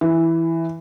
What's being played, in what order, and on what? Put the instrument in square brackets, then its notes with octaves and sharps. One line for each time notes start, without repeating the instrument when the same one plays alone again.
[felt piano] E3